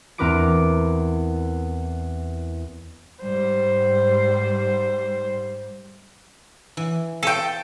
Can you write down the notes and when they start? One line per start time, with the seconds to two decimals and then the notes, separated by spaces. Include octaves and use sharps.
0.18 E2 C4 A#4 B4 D6 D7
3.22 G#2 G3 C5
6.77 E3
7.23 A4 G5 G#5